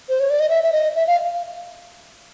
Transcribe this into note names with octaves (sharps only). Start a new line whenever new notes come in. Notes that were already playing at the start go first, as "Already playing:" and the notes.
C5
C#5
D5
D#5
E5
E5
D#5
E5
F5